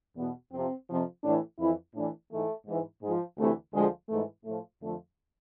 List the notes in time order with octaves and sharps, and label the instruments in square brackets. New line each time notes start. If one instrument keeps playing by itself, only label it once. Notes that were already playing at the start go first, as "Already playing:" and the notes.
[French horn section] E2 B2 B3
F2 C3 F3 C4
F2 C3 F3
A2 E3 D4
F2 E3 E4
A2 E3 D4
G#2 E3 A3
G#2 E3
G#2 F3 G#3
D2 C3 E3 A3
D2 D3 F3 G#3
G#2 E3 A3
A2 F3 A3
F2 D3 F3 A3